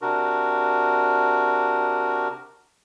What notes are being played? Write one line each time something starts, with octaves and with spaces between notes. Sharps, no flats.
C3 D4 F#4 A#4